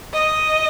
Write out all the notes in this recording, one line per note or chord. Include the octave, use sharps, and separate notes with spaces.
D#5